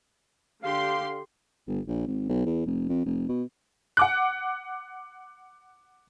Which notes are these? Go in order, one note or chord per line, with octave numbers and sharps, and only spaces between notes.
D3 G4 F5 C6
G1
A#1
G#1
B1
E2
F1
F2
F1
B2
F#5 D6 F#6